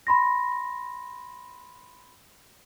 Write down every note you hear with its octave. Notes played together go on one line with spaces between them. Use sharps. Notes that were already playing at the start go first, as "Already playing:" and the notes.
B5 C6 A#6